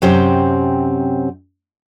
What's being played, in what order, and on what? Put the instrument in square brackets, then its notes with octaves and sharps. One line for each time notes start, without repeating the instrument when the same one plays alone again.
[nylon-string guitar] F#2 C3 C4 C#4 G4 C5